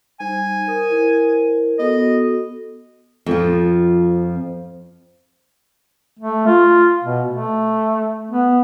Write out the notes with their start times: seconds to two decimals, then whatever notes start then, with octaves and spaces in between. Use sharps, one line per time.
0.20 G3 D#4 C5 G#5
0.67 A#4 D#6
0.89 E4 A#4 C5
1.79 B3 F#4 A4 D#5
3.26 F2 F3
6.19 A3
6.47 F4
7.04 B2
7.31 A3
8.31 B3